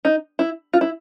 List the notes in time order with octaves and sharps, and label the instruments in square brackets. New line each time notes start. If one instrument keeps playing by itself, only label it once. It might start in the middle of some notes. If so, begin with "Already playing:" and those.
[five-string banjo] D#4
E4
F4
E4